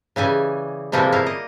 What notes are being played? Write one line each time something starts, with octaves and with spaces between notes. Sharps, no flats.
C#3 E3 G3 G#5
C3 E3 F3 G3 G#3 A#3
G3 A#3 E4 F5
D#5